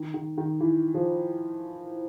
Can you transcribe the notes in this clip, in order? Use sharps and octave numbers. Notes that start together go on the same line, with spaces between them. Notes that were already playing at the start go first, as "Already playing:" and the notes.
Already playing: D#3
D#3
D#3
E3
F3